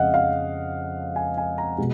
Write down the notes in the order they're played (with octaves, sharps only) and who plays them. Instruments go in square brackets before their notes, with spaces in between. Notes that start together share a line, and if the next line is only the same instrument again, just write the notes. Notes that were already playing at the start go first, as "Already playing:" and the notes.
Already playing: [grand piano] F2 C#3 G#3 D#5 F5 F#5
F5
G#5
G#5
A#5
B2 G#3